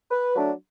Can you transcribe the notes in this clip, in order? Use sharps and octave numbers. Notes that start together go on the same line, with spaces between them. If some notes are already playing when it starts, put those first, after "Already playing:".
B4
F#3 A3 D4